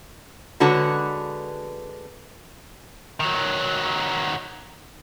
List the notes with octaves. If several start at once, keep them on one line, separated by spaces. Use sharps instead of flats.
D3 G#3 F#4 B4 C#5 A5
D#3 F#3